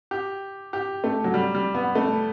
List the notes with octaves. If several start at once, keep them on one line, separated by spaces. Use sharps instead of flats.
G4
G4
A3
F#3
G3
G3
B3
A3